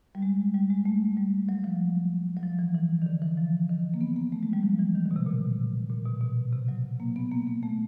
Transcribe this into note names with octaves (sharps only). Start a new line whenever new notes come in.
G3
G#3
G3
G#3
A3
G3
F#3
F3
F#3
F3
E3
E3
D#3
D3
E3
F3
D#3
A#3
B3
A#3
A3
G#3
G3
F3
E3
D#3
D3
B2
C3
A#2
A#2
B2
B2
C3
F#3
A#3
B3
A#3
A#3
A3